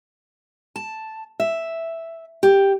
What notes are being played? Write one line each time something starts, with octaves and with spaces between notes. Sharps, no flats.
A5
E5
G4